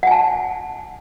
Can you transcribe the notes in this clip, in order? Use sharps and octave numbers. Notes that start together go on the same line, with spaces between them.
F#5 G#5 A5